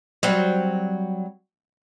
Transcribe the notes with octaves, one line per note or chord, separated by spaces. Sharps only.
F#3 G3 C4